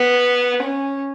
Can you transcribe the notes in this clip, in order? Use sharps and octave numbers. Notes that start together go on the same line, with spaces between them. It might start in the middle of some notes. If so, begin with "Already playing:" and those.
Already playing: B3
C#4